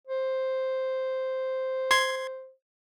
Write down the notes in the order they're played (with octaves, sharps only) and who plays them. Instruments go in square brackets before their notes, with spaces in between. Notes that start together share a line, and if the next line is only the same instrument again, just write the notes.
[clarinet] C5
[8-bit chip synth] C6 G#6